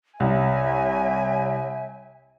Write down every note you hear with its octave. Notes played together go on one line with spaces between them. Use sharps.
C2 C#5 E5 G#5